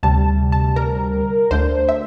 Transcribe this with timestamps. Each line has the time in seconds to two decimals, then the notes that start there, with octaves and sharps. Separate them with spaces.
0.03 D2 C3 G3 A5
0.52 A5
0.76 A#4
1.51 D2 D3 A3 D4 C5
1.89 E5